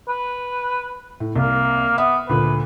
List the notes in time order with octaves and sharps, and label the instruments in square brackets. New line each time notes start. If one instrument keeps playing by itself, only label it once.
[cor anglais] B4
[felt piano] A2
[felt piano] C2 [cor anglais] A#3
[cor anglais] B3 [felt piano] E5
[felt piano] D2 A#2 [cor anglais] B4